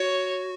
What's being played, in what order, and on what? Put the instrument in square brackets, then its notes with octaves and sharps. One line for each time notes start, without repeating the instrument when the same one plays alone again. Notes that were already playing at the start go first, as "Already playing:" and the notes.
Already playing: [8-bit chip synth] F#4 [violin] C#5